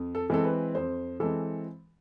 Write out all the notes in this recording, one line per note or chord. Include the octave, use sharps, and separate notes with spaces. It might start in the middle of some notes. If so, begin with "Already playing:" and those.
Already playing: F2
A4
E3 G#3 C4 A4
B4
F2 C5
E3 G#3 C4 A4